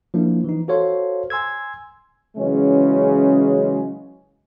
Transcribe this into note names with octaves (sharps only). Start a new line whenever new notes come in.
F3 A#3 D4 E4
E3 D#4
F#4 A4 C5 C#5 F5 C6
G#5 C6 E6 G#6
C#3 E3 F#3 G#3 C#4